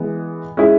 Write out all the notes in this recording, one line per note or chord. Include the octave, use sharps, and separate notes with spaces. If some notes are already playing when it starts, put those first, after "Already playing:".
Already playing: E3 G#3 B3
G#3 C#4 E4 G#4